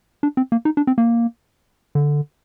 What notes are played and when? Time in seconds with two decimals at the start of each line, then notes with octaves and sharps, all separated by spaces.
0.23 D4
0.37 C4
0.52 A#3
0.65 D#4
0.77 D4
0.87 C4
0.98 A#3
1.95 D3